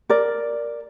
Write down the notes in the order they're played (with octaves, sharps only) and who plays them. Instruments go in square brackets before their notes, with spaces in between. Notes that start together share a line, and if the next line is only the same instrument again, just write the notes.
[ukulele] A#4 D5